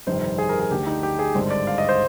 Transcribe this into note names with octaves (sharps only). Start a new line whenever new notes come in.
G1 F2 C3 D#3 C5
G#4
A#4
G#4
D2 D3 G4
D#4
G4
G#4
G#1 G2 D3 C5
D5
F5
D#5
C5